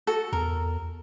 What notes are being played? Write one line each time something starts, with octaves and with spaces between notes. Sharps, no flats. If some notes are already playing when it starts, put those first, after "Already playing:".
F#4 A4
E2 A#4